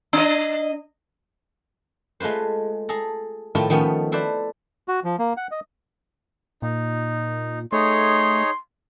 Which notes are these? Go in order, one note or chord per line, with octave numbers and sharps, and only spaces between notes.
D4 D#5
G#3 A3 F4 B4 C5
G#4 A4 A#5
A2 D#3 F3 A3 E4 F4
D#3 F3 A3 B3 C#4
E4 A4 B4 C5 D5
F#4
F3
A#3
F#5
D#5
A#2 D#4
A3 D#4 G#4 C#5 C6